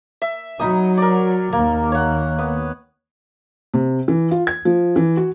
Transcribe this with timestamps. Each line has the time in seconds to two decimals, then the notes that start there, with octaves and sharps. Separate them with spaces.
0.22 E5
0.59 F#3 D#4 B5 D#6
0.98 A#4 D5
1.53 D#2 A#3
1.92 C#5 F#5
2.39 B3
3.74 C3
4.08 E3
4.31 F4
4.47 G#6
4.65 F3
4.96 E3
5.17 F#4